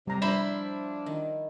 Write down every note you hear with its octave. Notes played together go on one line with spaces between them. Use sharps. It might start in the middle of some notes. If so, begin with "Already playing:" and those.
C3 G3 A#5
F3 D4 E4 C5 B5
D#3